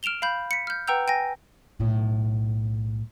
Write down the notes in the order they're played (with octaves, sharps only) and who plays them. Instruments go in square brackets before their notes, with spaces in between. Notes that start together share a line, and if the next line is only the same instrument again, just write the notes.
[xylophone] F6 D7 E7 F7 G7
F5 B5 G6
B6 C#7
F6 G6
B4 F#5 G5 A#5 E6 G6
G5 G#5 A#6
[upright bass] B1 A2